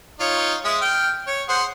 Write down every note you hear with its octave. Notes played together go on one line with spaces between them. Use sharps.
D#4 F4 C#5
G#3 E5
G5 F6
C#5
G#4 C5 F#5